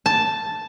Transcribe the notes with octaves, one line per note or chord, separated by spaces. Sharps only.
A5